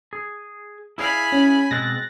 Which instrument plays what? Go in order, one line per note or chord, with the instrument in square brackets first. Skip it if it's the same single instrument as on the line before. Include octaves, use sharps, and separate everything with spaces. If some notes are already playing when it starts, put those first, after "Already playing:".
[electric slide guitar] G#4
[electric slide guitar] E4 G#4 F5 [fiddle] G#5 B5
[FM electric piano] C#4
[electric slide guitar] B2 G#3 C4 [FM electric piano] F#6 A6 A#6